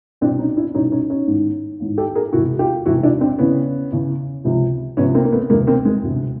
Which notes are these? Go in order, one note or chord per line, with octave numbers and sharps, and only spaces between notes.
C2 B2 C4 D4
C#4 D#4
D4 E4
C2 B2 C#4 D#4
C#4 D#4
C#4 D#4
A1 G#2 D#3
A1 G#2 D#3
G4 A4
G#4 A#4
E1 E2 C3 E4 F#4
F4 G4
E1 E2 C3 E4 F#4
D4 E4
C4 D4
E2 C#3 E3 B3 C#4
E2 C#3 E3
C#2 C3 F3
C#2 C3 F3 B3 C#4
A#3 C4
A#3
A3 B3
E1 D2 C3 G#3 A#3
A#3 C4
G#3
E1 D2 C3